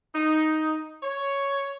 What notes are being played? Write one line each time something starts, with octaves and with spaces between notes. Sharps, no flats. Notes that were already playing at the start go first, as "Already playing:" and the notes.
D#4
C#5